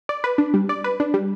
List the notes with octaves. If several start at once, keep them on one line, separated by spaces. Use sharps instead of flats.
D5
B4
D4
G3
D5
B4
D4
G3